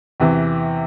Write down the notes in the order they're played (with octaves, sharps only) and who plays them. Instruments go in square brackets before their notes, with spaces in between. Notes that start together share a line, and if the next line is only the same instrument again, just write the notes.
[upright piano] E2 C3 E3